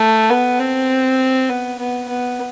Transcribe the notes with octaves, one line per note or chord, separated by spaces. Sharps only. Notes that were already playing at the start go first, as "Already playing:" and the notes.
Already playing: A3
B3
C4
B3
B3
B3